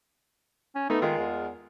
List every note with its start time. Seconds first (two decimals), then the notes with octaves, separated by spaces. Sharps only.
0.76 C#4
0.90 A3 B3 D#4
1.02 D#3 G#3 F4 A#4
1.18 E2